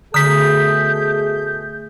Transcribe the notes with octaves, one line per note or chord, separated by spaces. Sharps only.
B2 D3 A3 G#4 A#5 D#6 G6 B6